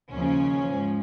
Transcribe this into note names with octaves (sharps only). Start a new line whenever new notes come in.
D#2 C#3 F3 C#4
G#2 F3